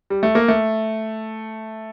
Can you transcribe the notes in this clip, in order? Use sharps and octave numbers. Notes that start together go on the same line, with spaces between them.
G3
A3
A#3
A3